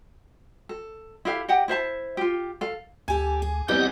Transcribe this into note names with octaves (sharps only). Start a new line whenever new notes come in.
A4
E4 G4 A4 F5
G4 D#5 F#5 G5
E4 C5 E5 A5
F4 G4
A4 F5
D2 G4 A4 G#5
G#4
E2 E3 G3 C4 G4 D#5 F#5 G5